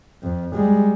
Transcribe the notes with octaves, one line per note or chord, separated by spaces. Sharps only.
F2
G3 G#3